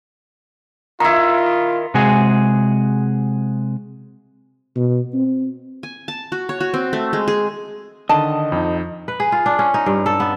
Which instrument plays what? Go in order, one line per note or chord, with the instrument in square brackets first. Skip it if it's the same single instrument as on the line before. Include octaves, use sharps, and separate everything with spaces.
[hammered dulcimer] D#3 E4 [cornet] F4 [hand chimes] A#5
[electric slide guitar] C3 G#3 F#4 G#4
[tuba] B2
C4
[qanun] G#5
A5
F#4
C#5
F#4
C4
A3
G#3
G#4
[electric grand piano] D3 D#3 [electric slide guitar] D#5 [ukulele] A5
[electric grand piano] F2 D#4
[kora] B4
G#4
F4
D4
C#4
D#4
G2
A4
B3